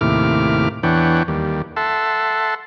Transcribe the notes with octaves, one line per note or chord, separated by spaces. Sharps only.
D#2 A2 C3 E4 D6 F6
E2 E3 D4 C#5 F#5 G5
D#2 G3
A4 E5 F#5 A5 C6